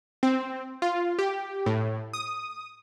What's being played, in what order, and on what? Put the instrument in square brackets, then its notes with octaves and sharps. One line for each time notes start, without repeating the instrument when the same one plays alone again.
[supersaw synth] C4
F4
G4
A2
D#6